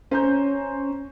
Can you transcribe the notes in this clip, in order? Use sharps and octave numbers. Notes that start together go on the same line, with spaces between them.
C#4 C5 A#5 G6